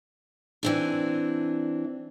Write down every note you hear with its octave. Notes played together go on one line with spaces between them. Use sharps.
E3 C4 D4